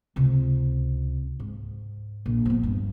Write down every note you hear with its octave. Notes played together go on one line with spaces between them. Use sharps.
C#2 C3
G#2
A#1
F3 B3
G2